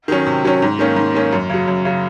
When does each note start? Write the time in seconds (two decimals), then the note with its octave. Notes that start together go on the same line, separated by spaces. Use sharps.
0.08 D#3 F#3 C#4
0.27 C3
0.44 D#3 F#3 C#4
0.62 G#2
0.79 D#3 A#3 C#4
0.96 G#2
1.14 D#3 A#3 C#4
1.33 F#2
1.50 C#3 F#3
1.68 F#2
1.85 C#3 F#3